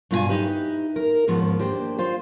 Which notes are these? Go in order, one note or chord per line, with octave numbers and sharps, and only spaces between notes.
G2 B2 F4 G4 G#5
D#4 E4 G4 B4
A#4
D#2 G#2 F3 B3
A#3 D4 G4 C5
F4 C5